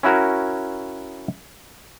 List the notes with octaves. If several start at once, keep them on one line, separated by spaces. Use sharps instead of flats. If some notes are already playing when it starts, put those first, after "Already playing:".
C#4 E4 F#4 A#4